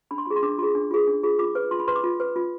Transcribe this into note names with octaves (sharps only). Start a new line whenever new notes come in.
D4 B5
C6
F4 G#4 B5
C6
D4 D6
F4 G#4 C6
D4
F4 G#4
D4
F4 G#4
F4 D6
B4
F4 C6
B5
B4 C6
D6
F4
B4
F4